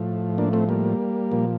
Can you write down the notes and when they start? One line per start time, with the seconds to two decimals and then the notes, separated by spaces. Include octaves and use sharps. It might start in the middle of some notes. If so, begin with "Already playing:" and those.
Already playing: A2 F3
0.38 A#3 D4
0.53 A3 C4
0.69 G3 A#3
1.32 A#2 F3